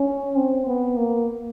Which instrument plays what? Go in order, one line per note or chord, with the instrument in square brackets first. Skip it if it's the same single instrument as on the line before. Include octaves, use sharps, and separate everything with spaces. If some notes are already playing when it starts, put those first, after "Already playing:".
Already playing: [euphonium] C#4
C4
B3
A#3